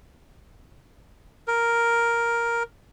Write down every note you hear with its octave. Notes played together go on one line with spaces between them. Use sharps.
A#4